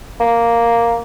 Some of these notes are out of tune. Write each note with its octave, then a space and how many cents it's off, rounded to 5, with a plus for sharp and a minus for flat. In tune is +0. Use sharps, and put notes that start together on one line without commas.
A#3 +0